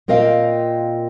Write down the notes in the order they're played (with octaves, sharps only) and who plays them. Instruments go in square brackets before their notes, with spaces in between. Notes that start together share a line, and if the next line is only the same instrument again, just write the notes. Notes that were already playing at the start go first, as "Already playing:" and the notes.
[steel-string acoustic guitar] A#2 C4 A#4 D#5 F5 G5